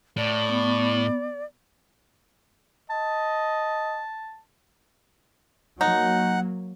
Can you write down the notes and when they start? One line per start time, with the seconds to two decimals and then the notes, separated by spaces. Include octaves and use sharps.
0.17 A2 D5
0.49 B3
2.90 D#5 A5
5.81 F#3 A#3 D#4 F#5